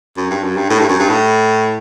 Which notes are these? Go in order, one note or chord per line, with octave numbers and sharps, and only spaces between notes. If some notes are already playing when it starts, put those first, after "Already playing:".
F#2
G2
F#2
G2
A2
G2
F#2
G2
A2